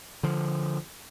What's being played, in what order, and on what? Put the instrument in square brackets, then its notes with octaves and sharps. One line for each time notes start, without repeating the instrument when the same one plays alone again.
[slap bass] D3 F3